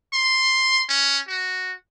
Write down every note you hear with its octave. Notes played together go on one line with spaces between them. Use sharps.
C6
C#4
F#4